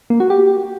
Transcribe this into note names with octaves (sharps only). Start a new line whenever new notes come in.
A#3
F#4
G4